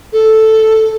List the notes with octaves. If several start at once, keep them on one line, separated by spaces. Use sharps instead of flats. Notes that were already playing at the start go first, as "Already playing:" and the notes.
A4